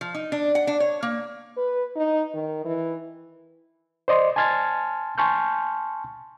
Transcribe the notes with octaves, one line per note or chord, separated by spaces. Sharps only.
F3
D#4
D4
F#5
D4
C#5
A#3
B4
D#4
D#3
E3
C5 D5 D#5 C6
G#5 A5 C6 F6 G#6 A6
G#5 A5 C6 C#6 F6 G6